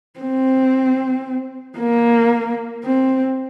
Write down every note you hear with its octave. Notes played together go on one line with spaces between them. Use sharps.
C4
A#3
C4